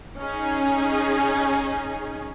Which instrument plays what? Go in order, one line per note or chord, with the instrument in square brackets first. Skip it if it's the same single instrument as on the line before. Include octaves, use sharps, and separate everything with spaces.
[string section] C#4 D#4 G#4